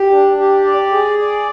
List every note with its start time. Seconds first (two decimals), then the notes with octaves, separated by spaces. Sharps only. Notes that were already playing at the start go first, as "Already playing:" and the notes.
Already playing: G4
0.10 D4
0.37 G4
0.64 D5
0.91 G#4
1.19 D5